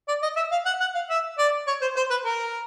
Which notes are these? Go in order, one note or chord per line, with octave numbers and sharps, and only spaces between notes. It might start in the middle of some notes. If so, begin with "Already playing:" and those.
D5
D#5
E5
F5
F#5
F#5
F5
E5
D5
C#5
C5
C5
B4
A#4